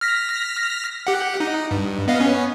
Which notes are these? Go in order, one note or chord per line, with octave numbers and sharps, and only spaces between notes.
F6 A#6 B6
G4 F#5
D#4
G2
B3 D#5 F5
B3 C#4